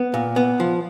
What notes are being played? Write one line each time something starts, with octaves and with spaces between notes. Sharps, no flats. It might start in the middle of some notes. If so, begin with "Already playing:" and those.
Already playing: B3
A#2
B3
F3